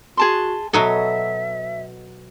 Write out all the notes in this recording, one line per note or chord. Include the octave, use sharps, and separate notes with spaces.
F#4 G#4 A5 C6
B2 F#3 A4 D#5 E5